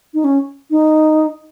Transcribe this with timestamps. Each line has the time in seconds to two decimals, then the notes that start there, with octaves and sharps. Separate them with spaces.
0.14 D#4
0.24 C#4
0.71 D#4